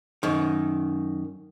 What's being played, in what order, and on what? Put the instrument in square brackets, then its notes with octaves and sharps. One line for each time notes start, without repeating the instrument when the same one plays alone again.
[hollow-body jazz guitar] F#2 D#3